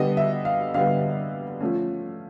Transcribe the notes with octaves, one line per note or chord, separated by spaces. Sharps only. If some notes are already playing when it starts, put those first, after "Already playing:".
Already playing: D3 G3 B3 D#5
E5
F5
D3 G3 B3 F5
F3 A3 C#4